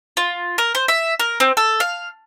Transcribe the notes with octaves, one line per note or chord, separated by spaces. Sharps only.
F4
A#4
C5
E5
A#4
C4
A4
F5